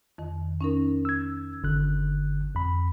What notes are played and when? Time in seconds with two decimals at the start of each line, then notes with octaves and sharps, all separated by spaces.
0.18 F2 D#3
0.61 C#4 D#4 A#4
1.05 E6 G#6
1.63 G1 D3 F#6
2.55 F2 B5